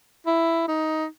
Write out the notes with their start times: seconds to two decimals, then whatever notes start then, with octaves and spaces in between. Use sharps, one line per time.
0.27 E4
0.68 D#4